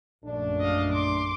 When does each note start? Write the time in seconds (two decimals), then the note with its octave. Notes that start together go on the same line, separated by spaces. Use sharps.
0.25 A#1 F#2 A3 D4
0.60 D#5 F5
0.92 C6 D6